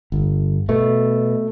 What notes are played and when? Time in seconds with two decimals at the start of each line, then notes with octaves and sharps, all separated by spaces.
0.12 G1
0.69 B2 A3